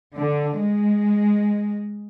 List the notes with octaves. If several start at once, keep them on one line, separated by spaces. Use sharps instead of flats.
D3
G#3